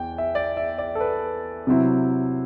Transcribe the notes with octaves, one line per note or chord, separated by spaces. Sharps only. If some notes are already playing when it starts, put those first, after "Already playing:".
Already playing: E2 G5
E5
D5
E5
D5
A4
B4
C3 F#3 C4 E4